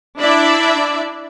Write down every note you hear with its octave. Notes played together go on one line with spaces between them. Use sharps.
D4 E4 D5 E5